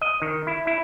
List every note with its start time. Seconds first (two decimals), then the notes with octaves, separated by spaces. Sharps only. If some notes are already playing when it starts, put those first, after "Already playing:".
0.01 D#5
0.22 D#3
0.47 E4
0.67 E4